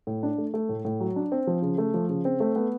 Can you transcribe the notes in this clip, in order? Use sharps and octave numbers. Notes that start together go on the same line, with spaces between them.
A2
D4
A3
A3
A2
A2
F#3
D4
C4
F3
C#3
A3
F3
C#3
C4
A3
B3